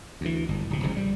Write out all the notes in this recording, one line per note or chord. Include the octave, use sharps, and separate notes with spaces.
D2 E3
G1
D1 C3
G1 C#3 F3
G3